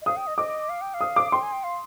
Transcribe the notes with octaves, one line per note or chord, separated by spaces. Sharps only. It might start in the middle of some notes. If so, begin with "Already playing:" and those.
D#5
F5 D#6
G5
D#5
D#5 D6
F5
G5
F5
D#6
D6
G5 C6
G#5
G5
F5